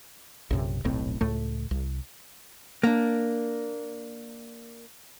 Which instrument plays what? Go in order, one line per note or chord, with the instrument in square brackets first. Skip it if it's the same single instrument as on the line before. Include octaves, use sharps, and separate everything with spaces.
[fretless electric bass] A#1 F#2 C3
D#1 B1 A2 C4
C#2 A2 A3
C2
[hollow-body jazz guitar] A#3 D4